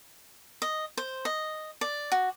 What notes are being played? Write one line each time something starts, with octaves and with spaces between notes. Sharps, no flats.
D#5
C5
D#5
D5
F#4